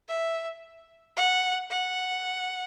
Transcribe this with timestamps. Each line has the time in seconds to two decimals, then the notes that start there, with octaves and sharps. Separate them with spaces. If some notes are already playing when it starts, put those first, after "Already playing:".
0.08 E5
1.16 F#5
1.70 F#5